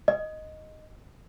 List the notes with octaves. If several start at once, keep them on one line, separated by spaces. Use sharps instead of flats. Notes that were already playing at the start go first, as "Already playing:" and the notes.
D#5